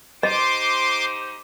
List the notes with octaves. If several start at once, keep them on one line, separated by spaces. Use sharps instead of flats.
D#4 G4 C5 D#5 C6 D6